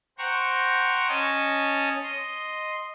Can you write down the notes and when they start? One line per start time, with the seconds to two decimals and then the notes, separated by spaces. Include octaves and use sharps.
0.18 C5 F#5 G5 A#5 C#6
1.08 C#4 C#5 D#5 A5
2.03 D#5 C6